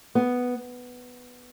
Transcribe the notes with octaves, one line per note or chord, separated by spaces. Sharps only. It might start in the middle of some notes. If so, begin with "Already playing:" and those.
B3